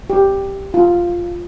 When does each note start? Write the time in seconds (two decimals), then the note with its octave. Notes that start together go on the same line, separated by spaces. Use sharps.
0.10 G4
0.74 F4